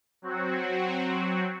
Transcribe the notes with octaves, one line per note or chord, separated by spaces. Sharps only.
F#3 C4 F#4